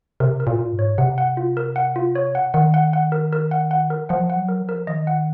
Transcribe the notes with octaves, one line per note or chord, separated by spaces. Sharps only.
C3 A#4
A#4
A#2
F4
G#2
C#5
C3 F#5
F#5
F4
A#4
F#5
F4
C#5
F#5
D#3 F#5
F#5
F#5
A#4
A#4
F#5
F#5
A#4
F3 F#5
F#5
F#3
A#4
F3
A#4
D#3 D#5
F#5